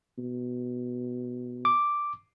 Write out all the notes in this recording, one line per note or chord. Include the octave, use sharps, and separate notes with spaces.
B2
D6